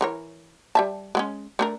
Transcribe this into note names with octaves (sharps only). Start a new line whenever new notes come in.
E3 A#4 C#5
G3 E5 A5
G#3 B3 C#4
A3 D4 A#4